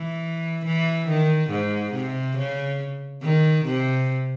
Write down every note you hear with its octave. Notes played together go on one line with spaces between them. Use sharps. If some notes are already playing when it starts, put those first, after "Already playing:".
Already playing: E3
E3
D#3
G#2
C3
C#3
D#3
C3